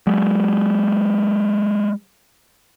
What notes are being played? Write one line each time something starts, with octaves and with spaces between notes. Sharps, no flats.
F#3 G#3